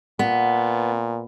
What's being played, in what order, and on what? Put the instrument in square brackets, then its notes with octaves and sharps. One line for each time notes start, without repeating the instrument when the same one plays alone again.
[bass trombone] A#2 [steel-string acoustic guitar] B3